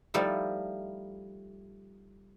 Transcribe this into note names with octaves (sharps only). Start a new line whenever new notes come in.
F3 G3 A3 D#4 E4